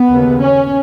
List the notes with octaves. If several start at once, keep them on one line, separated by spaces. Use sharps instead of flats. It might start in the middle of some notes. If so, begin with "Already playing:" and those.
Already playing: B3
D#2 C#3
C#4